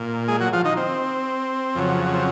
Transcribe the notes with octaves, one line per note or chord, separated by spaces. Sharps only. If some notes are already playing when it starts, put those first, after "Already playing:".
Already playing: A#2
G#3 G#4
F#3 F#4
F3 F4
D#3 D#4
C4
F2 C#3 F#3
C4